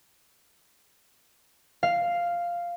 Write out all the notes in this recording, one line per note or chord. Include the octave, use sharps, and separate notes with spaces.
F5